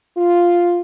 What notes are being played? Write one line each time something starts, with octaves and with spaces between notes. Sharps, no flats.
F4